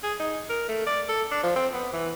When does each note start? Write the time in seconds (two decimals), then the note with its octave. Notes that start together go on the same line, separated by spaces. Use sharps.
0.03 G#4
0.20 D#4
0.50 A#4
0.68 A3
0.86 D5
1.09 A4
1.31 D4
1.43 F3
1.56 C4
1.73 B3
1.93 E3